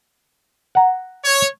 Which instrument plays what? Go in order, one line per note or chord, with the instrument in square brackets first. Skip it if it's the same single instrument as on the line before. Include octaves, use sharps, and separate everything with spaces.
[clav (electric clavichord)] F#5 A#5
[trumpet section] C#5